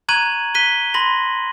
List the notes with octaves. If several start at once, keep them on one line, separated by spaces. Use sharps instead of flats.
A#5 C#6 F#6 G#6 D#7 F#7
F#6 B6 D#7 G7
B5 C6 A#6 F#7